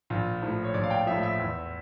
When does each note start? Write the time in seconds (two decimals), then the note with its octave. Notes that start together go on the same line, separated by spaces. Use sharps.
0.10 A#1 F4
0.42 A2 F3
0.64 C#5
0.74 A#1 D5
0.84 F5
0.91 G5
1.07 A2 F3 E5
1.23 E5
1.39 E2